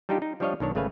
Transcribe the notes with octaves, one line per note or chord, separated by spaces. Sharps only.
G3 D4 D#4 F4 G4
D#4
F3 G3 D4 C#5 D#5 F5
B1 D#3 D4 C#5
G#1 C#3 A3 B4 F5 G#5